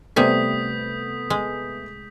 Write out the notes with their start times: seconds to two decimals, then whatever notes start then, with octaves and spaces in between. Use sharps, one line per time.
0.16 C3 G3 A3 B3 G#5 D#6 G6 B6
1.30 G#3